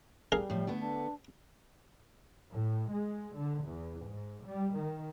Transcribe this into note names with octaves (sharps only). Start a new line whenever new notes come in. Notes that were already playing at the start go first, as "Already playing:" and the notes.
G3 G#4 A#4 F5
A2 F3
D3 A3 B3
D4
A2
G#3
D3
E2
G#2
G3
D#3